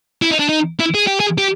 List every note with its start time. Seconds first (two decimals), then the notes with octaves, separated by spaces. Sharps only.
0.22 E4
0.31 D#4
0.39 D4
0.49 D#4
0.80 E4
0.95 G#4
1.07 G4
1.20 G#4
1.38 G4